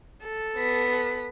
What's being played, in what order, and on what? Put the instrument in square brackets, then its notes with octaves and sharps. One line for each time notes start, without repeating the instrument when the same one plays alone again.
[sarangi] A4
[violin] B3 B6